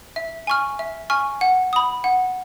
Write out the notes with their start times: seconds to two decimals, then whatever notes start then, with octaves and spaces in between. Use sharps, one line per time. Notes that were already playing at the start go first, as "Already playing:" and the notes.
0.16 E5
0.47 G#5 C#6 F6
0.79 E5
1.10 G#5 C#6 F6
1.41 F#5
1.73 B5 D#6
2.04 F#5